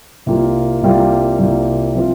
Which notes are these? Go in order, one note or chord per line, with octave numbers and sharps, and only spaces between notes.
C2 C3 G3 A#3 F4
C2 C3 G3 A#3 F4
C2 C3 G3 A#3 F4
C3 F3 C4 F4